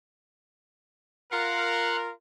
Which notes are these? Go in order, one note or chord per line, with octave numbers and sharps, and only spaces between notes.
F4 A#4 F5 F#5